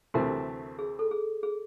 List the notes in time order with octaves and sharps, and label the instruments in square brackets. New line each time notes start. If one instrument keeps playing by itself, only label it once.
[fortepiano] D2 C3 E3 A3 C4 [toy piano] A#4
[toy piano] G#4
A4
G#4
G#4